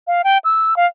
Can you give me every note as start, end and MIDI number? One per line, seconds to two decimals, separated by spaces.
0.07 0.22 77
0.24 0.38 79
0.44 0.74 88
0.77 0.87 77